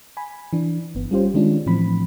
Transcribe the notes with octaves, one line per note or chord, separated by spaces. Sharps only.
G#5 B5
E3 D4
G1 B3
G3 C#4 F4 G4 C5
D#3 G#3 C#4 D4 F4
A2 E3 F3 C4 B5